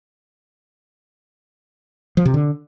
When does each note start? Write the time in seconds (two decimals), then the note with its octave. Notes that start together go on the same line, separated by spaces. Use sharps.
2.17 F3
2.25 C3
2.34 D3